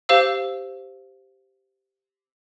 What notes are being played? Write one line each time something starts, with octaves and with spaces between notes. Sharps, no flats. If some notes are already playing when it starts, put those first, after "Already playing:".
G4 C5 F5 E6